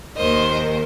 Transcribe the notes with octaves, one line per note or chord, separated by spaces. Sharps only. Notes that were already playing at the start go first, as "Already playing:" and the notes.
D#2 D#3 C5 D#5